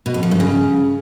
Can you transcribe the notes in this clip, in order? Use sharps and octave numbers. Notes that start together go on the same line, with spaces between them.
B2
F2
F3
G2
C#3